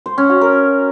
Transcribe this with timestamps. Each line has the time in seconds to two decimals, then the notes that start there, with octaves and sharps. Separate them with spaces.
0.06 C5
0.18 C#4
0.30 F#4
0.41 A#4